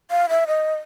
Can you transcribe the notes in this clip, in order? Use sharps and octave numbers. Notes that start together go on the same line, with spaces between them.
F5
E5
D#5